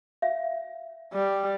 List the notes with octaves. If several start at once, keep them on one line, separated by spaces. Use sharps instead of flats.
E5 F5
G3